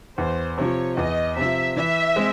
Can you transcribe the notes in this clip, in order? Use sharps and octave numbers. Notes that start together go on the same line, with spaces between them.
E2 C5
C3 F3 C#5
E2 D#5
C3 F3 E5
E3 E5
G#3 C4